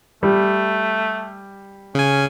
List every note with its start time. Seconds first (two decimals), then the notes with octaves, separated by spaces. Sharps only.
0.23 G3 A3
1.95 C#3 C#4 G#5